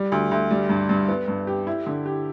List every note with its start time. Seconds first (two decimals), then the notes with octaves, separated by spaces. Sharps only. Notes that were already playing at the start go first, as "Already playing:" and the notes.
Already playing: G3
0.12 D2
0.31 D2
0.51 G3
0.69 G2
0.89 G2
1.08 B3
1.28 G2
1.47 G4
1.67 E4
1.86 D3
2.06 G4